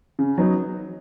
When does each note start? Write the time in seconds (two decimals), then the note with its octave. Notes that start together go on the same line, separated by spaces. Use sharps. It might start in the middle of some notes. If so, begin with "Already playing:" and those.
0.19 C#3
0.37 F#3 B3 D#4